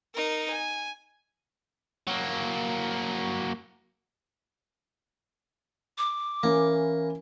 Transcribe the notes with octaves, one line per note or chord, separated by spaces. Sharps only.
D#4 A#4
G#5
F#3 A#3
D6
E3 A#3 C#4 E4